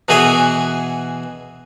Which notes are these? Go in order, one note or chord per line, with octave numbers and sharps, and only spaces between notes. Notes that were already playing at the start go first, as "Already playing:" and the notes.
B2 E3 F#4 G#4 B4 E5